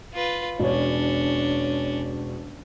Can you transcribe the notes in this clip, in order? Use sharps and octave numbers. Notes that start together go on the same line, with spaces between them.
F4 B4
E1 C#4 D4 C#5